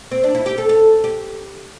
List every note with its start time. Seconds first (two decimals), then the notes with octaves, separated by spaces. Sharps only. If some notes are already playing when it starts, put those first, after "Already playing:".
0.11 C4
0.24 D4
0.35 E4
0.46 G4
0.58 A4
0.69 A4
1.04 G4